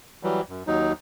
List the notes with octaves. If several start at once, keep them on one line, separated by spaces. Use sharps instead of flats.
E3 F#3 G3
F#2
D#2 F#3 D#4